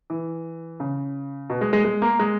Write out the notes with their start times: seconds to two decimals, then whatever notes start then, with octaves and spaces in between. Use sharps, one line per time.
0.10 E3
0.80 C#3
1.50 B2
1.61 G#3
1.73 G#3
1.84 G#3
2.02 A#3
2.19 G#3